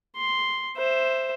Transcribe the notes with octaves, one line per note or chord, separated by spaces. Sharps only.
C6
C5 E5